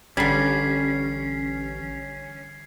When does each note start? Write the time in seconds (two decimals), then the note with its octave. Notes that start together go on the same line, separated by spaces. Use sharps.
0.17 A1 D3 G3 C#4 G#6 B6 C7